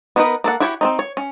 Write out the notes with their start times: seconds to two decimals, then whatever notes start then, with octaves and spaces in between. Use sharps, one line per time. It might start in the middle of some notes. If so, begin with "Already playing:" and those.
0.16 B3 D4 D#4 A#4 B4
0.44 A#3 A4 F#5
0.60 E4 F#4 G4 C#5
0.81 C4 C#4 D#4
0.99 C#5
1.17 C#4